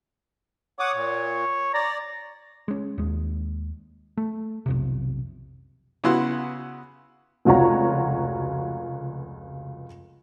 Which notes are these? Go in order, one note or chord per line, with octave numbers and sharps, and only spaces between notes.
C#5 F#5 D6 D#6
A#2
D5 A#5
G#3 C#4
D#2 G#3
A3
B1 F2 C3
C#3 B3 E4 F#4 C6
F1 C#2 F4 F#4 C#5 A#5